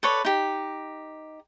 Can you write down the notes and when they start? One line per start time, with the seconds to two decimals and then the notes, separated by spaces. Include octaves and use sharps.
0.03 A4 B4 C#5 D5
0.25 D#4 G4